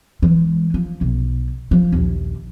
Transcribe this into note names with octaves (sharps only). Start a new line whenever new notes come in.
E3 G#3
F3
B1
F3
A#1 D#2